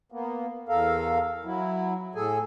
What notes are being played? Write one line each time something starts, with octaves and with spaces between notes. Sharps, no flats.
A#3 B3
E2 A4 A#4 F5
F#3 E4
A2 G#4 A4 G#5